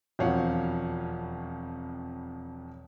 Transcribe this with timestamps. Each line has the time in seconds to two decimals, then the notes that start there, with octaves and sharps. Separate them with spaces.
0.19 E1 F2 F3 C#5 F5 F#5